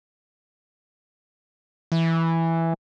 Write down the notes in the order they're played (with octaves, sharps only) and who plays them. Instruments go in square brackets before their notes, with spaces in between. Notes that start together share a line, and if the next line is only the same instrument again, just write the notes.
[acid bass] E3